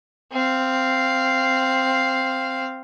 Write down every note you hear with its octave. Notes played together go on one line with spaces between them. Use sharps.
C4 F5